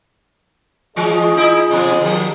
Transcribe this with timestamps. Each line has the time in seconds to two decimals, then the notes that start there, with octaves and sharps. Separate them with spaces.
0.96 E3 G#3 F4 G#4 D#5
1.35 D#4 E4
1.71 B2 F3 G#3
2.01 D#2 F3